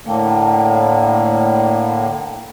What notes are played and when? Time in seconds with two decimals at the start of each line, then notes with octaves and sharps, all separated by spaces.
0.06 A2 D3 A3 A#3 G5 A5